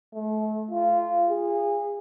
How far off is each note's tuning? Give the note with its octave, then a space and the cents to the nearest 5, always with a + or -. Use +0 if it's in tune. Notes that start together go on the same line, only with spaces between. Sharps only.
A3 -35
F4 -15
G#4 -30